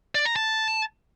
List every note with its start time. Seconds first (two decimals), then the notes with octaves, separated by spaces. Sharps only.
0.15 D5
0.25 A#5
0.36 A5